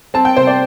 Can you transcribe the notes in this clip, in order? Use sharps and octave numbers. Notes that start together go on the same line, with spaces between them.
C4 A5
G5
C3 C5
D5